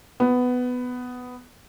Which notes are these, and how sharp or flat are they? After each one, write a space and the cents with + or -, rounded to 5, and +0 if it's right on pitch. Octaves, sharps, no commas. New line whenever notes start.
B3 +10